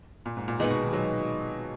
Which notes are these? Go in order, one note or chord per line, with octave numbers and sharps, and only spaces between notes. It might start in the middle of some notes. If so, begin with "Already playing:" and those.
A#2
G#2
A#2
A#2 G#3 B3 D#4
B2
D#3
F#3